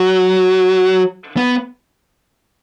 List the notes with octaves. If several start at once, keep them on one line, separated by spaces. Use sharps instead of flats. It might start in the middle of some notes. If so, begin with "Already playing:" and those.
Already playing: F#3
B3